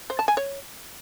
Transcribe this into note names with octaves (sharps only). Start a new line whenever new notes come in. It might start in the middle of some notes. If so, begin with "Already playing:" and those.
C5
A5
G#5
C#5